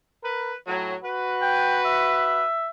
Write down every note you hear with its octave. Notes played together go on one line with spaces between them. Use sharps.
A#4 B4
A2 F#3
F#4 B4
G5
E5